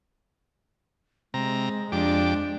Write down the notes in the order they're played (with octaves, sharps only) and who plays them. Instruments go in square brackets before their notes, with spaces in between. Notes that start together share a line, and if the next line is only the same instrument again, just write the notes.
[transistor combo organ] C3 A#5 [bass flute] G#3
[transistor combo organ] F2 G4 D6 [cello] D4